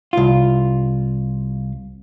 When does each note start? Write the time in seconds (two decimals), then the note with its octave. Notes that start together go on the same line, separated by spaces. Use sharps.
0.13 C2 F4